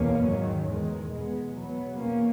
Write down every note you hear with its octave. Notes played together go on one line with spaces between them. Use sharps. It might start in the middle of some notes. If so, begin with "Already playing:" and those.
Already playing: E2 B2 A#3 C#4
G#2 D#3 F#3
E2 D#3 G#3
E2 B2 G#3 B3
B2 F#3 B3
E2 B2 A#3 C#4